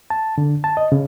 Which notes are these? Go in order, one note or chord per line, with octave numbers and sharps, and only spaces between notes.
A5
D3
A5
D#5
C#3